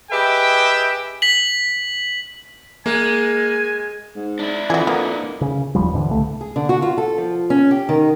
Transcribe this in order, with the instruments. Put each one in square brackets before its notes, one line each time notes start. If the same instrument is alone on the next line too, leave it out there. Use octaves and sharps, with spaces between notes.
[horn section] G4 G#4 B4 D#5 E5 G5
[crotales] B6 F#7
[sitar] G#3 [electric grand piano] A#3 [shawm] G#5
[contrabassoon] G#2
[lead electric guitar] D4 E4
[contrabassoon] F2 [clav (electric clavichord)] E3 [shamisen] F#4 G#4
[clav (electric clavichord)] A#3 [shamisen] B3
[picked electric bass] C#3
F1 D#2 F3 G3
G#2 D3 E3
C2 C#3 A3
[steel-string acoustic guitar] G#4
D3
F#4
F4
A4
F3
C#4
G4
D#3